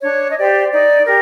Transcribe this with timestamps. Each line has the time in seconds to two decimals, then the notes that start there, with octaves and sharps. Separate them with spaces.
0.03 D4 C#5
0.29 D#5
0.37 G4 C5 D5
0.72 D#4 D5
1.06 G4 A#4